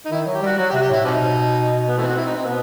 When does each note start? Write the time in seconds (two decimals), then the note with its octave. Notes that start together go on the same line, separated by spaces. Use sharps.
0.06 D#4
0.11 D#3 E4
0.26 F#3
0.35 G4
0.42 G3 F#4
0.58 F#3 F#4
0.70 G4
0.73 C3 F#4
0.82 G4
0.90 A2 E4
1.05 B2 G3 C4 D#4
1.89 B3
1.98 E3 A3 C4
2.08 F#4
2.17 E4
2.26 D#4
2.36 C4
2.45 B2 B3